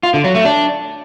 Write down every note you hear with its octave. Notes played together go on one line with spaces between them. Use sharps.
F4
D3
F#3
A3
D4